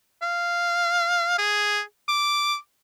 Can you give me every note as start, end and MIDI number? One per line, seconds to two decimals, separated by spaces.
0.22 1.37 77
1.38 1.81 68
2.08 2.57 86